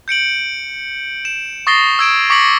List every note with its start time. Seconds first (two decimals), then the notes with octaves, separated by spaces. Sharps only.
0.08 G6 C#7 D7 F#7
1.25 E7
1.67 C#6 D#6 A6 A#6 C7 G7
1.99 E6 G#6 D7 E7
2.30 C#6 D6 A#6 B6 C#7 F#7